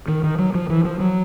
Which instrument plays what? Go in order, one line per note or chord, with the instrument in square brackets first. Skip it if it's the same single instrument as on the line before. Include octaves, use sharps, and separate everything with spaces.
[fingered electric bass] D#3
D#3
F#3
F3
E3
F3
F#3